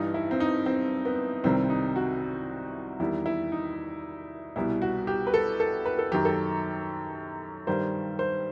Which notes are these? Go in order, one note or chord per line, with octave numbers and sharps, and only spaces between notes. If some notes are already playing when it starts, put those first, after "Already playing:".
Already playing: G2 E3 G3 D#4
E4
C4
D#4
C4
B3
C2 C3 D#3 G3 C4
D#4
F#4
E2 D#3 G3 E4
E4
D#4
C2 B2 G3 E4
F#4
G4
B4
A4
A4
B4
A4
F#2 D#3 F#3 G4
A4
G2 D#3 G3 C5
C5